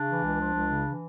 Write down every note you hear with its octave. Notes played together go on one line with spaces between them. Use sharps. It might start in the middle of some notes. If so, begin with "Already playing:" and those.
Already playing: C#3 D4
E3
C#2
F3
C#2
C#3
E3